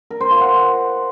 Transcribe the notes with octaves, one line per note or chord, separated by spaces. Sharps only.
A#4
C5
F4
F#5